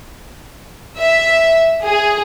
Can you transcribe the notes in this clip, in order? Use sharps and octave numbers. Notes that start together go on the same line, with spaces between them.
E5
G#4